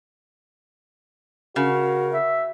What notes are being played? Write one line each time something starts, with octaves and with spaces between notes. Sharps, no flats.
C#3 F#4 A#4
E5